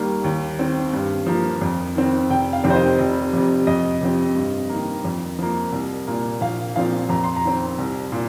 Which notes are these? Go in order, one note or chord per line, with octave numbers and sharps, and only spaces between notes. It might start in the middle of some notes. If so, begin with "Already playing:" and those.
Already playing: D#2 D#3 G3 A#3
D#2
D#3 C4
G2
F3 A#3
F2
D#3 C4
F1 G5
F5
F2 C3 D#3 C4
C5
D#5
F1
F2 C3
F2 D#5
C3 F3 C4
G2
D#3 A#3
F2
F3 A#3
C2
A#2 A#3
A#1 F5
A#2 F3 C4 F5
F2 A#5
C6
A#5
D#3 C4
C2
A#2